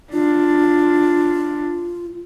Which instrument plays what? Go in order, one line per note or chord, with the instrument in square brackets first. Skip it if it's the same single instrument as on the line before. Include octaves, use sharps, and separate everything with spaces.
[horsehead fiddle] D4 [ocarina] F4